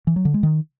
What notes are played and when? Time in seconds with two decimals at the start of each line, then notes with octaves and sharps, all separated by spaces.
0.07 E3
0.16 F#3
0.25 D3
0.34 G#3
0.43 D#3